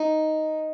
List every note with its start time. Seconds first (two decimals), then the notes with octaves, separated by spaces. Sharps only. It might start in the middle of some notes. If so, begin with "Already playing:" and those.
Already playing: D#4